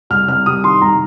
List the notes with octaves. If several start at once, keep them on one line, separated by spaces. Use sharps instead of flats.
C2 F6
C3 F6
C2 D#6
D#3 C6
C2 A#5